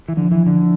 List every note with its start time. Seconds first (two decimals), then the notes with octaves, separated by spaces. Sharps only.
0.08 E3
0.17 D3 F3
0.32 E3
0.47 D3